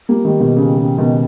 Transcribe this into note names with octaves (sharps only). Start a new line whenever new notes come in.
G3 A#3
D#3 G3
B2 D#3
C#3
C#3
B2 D#3